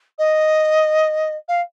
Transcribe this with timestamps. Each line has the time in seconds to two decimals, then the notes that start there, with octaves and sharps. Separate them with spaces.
0.18 D#5
1.48 F5